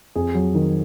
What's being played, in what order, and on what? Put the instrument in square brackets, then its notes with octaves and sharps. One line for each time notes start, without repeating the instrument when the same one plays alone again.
[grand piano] F2 G#4
F#3
D#3